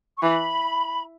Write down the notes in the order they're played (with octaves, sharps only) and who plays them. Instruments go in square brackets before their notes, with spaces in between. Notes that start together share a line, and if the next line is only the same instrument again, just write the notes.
[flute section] C#6
[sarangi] E3 [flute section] B5